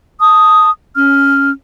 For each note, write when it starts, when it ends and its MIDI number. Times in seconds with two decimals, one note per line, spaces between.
0.20 0.69 81
0.20 0.69 87
0.95 1.49 61
0.95 1.49 89